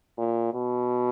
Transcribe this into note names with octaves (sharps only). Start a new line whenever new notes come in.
A#2
B2